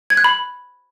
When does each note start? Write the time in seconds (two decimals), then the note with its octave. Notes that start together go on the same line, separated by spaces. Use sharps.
0.10 G#6
0.17 F#6
0.24 B5